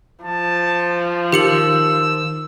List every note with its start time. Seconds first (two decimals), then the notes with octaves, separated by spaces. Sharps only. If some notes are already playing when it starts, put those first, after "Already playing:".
0.24 F3 A5
1.33 D#3 G4 E6 C#7 F#7